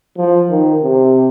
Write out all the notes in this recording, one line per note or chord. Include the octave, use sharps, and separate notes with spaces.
F3
D#3
C3